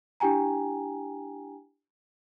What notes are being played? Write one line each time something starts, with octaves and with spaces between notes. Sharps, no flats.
D4 E4 G4 G5 G#5 A#5